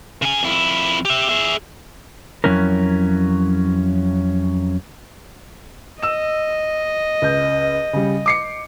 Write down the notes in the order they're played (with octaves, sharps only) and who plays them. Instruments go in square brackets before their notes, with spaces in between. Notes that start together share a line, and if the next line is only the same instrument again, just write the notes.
[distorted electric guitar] C#3 G#5
F2 E4
G4 E5
G#4 E5
[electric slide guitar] F2 B2 F#3 C#4 E4 A#4
[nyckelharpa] D#5 [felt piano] E6 E7
[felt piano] C#2 G6
C#3 G3
D6 C7 C#7